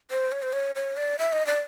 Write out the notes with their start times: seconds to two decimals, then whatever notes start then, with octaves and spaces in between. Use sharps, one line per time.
0.11 C5
0.32 C#5
0.42 C5
0.53 C#5
0.75 C#5
0.97 D5
1.19 E5
1.33 D#5
1.47 D5